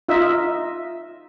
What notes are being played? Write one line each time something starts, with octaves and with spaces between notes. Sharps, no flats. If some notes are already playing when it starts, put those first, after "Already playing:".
D#4 F4 D#5 E5